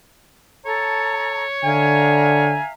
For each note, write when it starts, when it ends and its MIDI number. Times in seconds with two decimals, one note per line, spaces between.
0.65 1.44 69
0.65 2.51 73
0.65 1.44 81
0.65 1.44 82
1.64 2.60 50
1.64 2.72 76
1.64 2.72 77
1.64 2.68 80
1.64 2.72 82